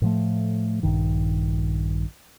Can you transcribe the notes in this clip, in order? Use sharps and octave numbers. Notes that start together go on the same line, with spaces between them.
A2 F3 A3
A#1 G2 D#3